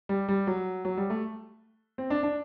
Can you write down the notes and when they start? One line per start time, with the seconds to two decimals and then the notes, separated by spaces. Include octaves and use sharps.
0.09 G3
0.29 G3
0.47 F#3
0.85 F#3
0.97 G3
1.10 A3
1.98 C4
2.10 D4
2.23 D4